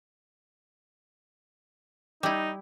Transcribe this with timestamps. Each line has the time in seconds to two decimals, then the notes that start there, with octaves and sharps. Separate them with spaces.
2.23 G3 D#4 E4